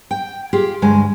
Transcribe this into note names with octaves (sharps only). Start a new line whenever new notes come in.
G5
F4 G4 G#4
D2 G2 G#3 G#5